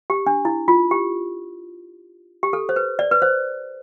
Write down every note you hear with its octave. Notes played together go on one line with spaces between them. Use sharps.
G4
D4
E4
F4
G4
G4
A4
C5
B4
D5
B4
C5